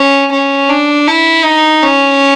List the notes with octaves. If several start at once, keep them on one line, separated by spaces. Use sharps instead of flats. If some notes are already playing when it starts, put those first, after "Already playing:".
Already playing: C#4
C#4
D4
E4
D#4
C#4